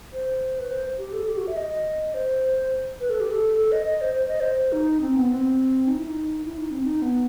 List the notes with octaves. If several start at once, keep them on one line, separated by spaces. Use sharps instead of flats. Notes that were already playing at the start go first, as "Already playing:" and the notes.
C5
B4
C5
G4
A4
G4
F#4
E5
D#5
C5
B4
A4
G4
A4
A4
D#5
D#5
C5
C5
D#5
C5
D#4
C4
B3
C4
D#4
E4
D#4
E4
D#4
C4
D#4
B3